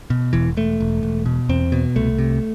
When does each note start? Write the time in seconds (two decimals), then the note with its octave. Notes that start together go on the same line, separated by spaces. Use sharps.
0.10 B2
0.33 E1 E3
0.57 E1 A3
0.80 E1
1.03 E1
1.26 B2
1.49 E2 C4
1.72 B2
1.96 C2 A3
2.19 C3